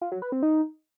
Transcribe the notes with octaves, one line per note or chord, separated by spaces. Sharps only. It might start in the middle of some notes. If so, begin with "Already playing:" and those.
F4
F#3
B4
C4
D#4